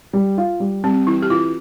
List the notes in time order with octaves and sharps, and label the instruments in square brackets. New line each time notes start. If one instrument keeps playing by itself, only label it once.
[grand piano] G3
F4
G3
[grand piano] G3 [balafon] C4
[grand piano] E3 [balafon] E4
[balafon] G4
[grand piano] E3 [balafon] F4